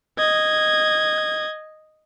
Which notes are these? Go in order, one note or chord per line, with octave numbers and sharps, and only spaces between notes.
D#5 G#6